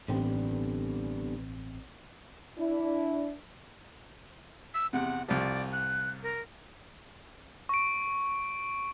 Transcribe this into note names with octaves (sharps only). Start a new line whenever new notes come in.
A1 D3 G3 B3 C4
D4 E4
E6
E2 C3 F#5
C2 F3 D5
F#6
A#4
C#6 D7